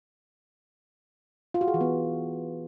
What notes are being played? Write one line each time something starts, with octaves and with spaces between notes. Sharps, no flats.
F4
F#4
G#4
E3
B3